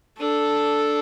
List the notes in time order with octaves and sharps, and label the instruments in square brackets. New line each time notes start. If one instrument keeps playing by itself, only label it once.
[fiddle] D4 [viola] A4